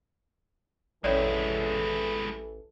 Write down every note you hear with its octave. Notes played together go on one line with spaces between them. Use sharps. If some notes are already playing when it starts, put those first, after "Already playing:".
A1 E3 G#3 C#4 E4 A4 C#5 D5